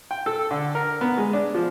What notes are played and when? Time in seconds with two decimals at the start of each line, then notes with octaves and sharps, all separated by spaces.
0.11 G5
0.26 A4
0.51 D3
0.75 A#4
1.01 B3
1.17 G#3
1.33 D4
1.54 F3